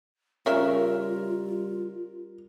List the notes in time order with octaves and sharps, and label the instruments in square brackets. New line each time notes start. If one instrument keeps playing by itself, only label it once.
[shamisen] C#3 C#4 E5 [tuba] G3 [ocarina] F4 [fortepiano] A#4